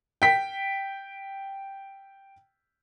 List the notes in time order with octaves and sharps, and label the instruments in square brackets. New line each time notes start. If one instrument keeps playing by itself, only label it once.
[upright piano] G5 B6